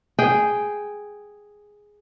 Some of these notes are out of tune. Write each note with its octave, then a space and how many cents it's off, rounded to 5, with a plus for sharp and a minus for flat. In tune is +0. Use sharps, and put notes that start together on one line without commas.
G#4 +0 G5 +0